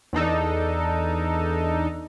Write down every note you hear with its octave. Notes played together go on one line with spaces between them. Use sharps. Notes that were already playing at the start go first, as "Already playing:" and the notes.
E2 D4 D#4 A4